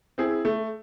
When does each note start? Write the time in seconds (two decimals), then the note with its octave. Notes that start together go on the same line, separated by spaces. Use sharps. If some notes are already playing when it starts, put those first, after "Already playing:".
0.18 C4 E4 G#4
0.45 A3